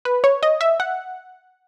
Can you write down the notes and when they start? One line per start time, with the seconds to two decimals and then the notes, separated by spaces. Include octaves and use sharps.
0.05 B4
0.24 C#5
0.43 D#5
0.61 E5
0.80 F#5